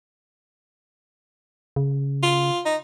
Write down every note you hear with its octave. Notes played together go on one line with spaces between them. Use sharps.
C#3
F4
D#4